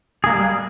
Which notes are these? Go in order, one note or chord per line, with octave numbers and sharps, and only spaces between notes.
G3 G#3 A#3 G#4